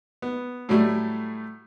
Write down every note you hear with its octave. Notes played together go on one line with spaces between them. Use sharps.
B3
A2 F#3 G3 A3